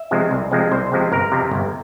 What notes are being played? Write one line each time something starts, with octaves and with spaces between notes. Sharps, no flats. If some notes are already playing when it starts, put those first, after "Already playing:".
Already playing: E5
C3 F3 G#3 C4
C2
C3 F3 G#3 C4
C2 C5
C3 F3 G#3 C4
G1 A#4
F2 C3 F3
G1